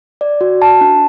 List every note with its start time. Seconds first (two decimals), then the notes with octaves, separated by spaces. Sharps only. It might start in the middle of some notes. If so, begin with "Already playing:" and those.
0.21 D5
0.41 F#4
0.62 A5
0.81 D4